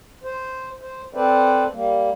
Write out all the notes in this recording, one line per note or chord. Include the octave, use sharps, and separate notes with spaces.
C5
C5
C4 A4 B4 C5 D5
G3 A#3